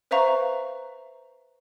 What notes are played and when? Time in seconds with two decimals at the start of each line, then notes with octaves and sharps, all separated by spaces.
0.11 B4 C5 E5 F5 A#5 C#6